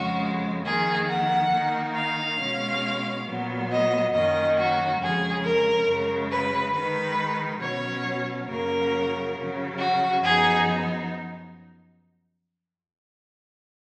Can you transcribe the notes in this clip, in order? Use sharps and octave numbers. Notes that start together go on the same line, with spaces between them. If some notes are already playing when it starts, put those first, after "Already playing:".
Already playing: F2 C#3 G#3 F#4
F2 D#3 A#3 G#4
F#5
D#3 A#3 D#4
F5
B2 G#3 C#4
A#2 F#3 B3
D#5
F#2 D#3 F#3 A#3 C#4 D#5
F#4
F2 C#3 F3 G#3 G#4
A#4
F#2 C#3 G#3
B4
D#3 G#3 D#4 B4
B2 F#3 C#4 C#5
F#2 C#3 F#3 A#3 C#4 A#4
C#3 F#3 C#4
F#4
F#2 F3 B3 D#4 G#4